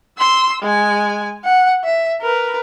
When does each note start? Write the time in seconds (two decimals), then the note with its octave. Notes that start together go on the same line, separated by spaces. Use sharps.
0.18 C6 E6
0.62 G#3 G#5
1.45 F#5
1.84 E5
2.22 A#4 B4